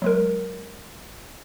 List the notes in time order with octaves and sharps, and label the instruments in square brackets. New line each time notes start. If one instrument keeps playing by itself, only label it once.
[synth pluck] F#3 G#3 A#4